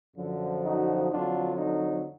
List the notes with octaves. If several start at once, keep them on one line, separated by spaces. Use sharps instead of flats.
F#2 D3 F3
D#4 F#4
F2 D3 F#3 D4 F4
D#4